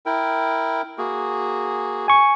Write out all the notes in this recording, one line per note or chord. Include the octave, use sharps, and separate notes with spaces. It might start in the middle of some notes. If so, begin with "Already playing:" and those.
E4 A#4 G5
A#3 F#4 G#4
G#5 C#6